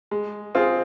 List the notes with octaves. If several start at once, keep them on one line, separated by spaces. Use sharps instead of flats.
G#3
C4 F4 G#4